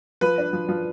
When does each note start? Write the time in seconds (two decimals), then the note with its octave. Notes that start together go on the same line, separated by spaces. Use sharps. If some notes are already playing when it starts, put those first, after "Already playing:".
0.21 F3 B4
0.38 D4
0.53 F3
0.69 F3